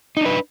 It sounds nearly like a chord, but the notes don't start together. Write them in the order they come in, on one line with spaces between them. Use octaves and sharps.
D#4 D4 B4